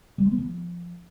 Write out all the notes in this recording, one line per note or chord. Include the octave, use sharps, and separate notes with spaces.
G3
G#3
B3
F3